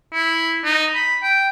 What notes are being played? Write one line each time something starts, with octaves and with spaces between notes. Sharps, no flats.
E4
D#4
B5
G5